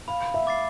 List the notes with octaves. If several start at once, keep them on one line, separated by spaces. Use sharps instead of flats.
F5 B5
E5
D6 A6 C7